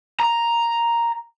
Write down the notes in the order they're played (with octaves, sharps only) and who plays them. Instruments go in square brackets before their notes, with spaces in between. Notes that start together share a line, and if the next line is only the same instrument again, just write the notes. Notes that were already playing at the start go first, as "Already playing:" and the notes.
[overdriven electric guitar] A#5